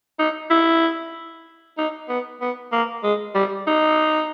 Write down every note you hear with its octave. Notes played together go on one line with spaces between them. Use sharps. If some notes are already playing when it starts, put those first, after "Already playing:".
D#4
E4
D#4
B3
B3
A#3
G#3
G3
D#4